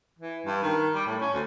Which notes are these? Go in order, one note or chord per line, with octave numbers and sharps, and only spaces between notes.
E3
G2
D#3
G3
A2
C#4
D2